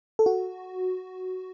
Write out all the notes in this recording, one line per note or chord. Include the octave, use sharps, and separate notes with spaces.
A4
F#4